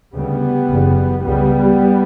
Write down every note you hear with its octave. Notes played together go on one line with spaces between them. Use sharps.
D2 C#3 G3 B3
F#1 E2 C#3
C#2 C#3 G3 B3